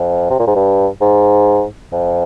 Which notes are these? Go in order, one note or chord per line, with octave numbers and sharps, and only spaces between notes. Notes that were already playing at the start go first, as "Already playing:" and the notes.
Already playing: F2
C3
A#2
G#2
G2
G#2
F2